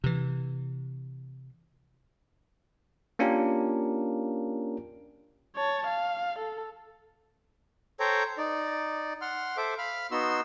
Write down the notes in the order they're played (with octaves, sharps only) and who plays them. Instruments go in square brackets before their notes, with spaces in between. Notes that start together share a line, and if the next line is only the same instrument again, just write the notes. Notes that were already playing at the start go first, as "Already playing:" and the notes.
[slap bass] C3 E3
[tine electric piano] A#3 C#4 D4 F4 G4 A#4
[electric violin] C#5 A5
F5
A4
[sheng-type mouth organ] A4 C5 C#5 G5 A#5
D#4 D5
F#5 C6 F6
A4 C5 E5 D6
F5 B5 F6
B3 D#4 F#4 C6 E6